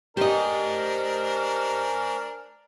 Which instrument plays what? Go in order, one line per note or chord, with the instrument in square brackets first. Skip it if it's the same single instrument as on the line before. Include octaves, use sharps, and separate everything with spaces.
[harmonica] D4 A#4 [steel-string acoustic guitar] G4 D#5 [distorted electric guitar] C5 G#5